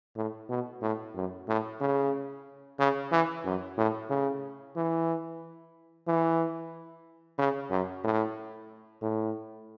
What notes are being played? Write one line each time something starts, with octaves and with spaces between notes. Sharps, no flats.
A2
B2
A2
F#2
A2
C#3
C#3
E3
F#2
A2
C#3
E3
E3
C#3
F#2
A2
A2